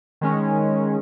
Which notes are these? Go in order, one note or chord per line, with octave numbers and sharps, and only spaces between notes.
D#3 G#3 C#4